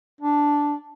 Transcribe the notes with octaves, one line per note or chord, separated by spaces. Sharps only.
D4